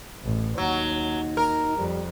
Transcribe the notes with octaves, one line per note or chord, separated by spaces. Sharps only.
A1
D#2 F#3 D#4
A#4
F2 G3